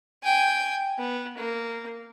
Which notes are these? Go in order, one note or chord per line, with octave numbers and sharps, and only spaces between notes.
G5 G#5
B3
A#3